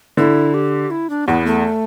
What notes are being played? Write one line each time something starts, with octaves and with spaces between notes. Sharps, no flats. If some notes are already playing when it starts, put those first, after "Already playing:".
D3 E4
G4
E4
D4
E2 B3
A3